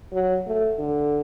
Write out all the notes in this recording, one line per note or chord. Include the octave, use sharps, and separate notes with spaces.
F#3
A3
D3